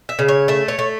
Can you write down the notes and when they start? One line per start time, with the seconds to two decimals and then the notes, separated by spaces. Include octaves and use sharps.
0.09 E5
0.19 C#3
0.28 C#5
0.48 A3 E5
0.68 C#5
0.79 A3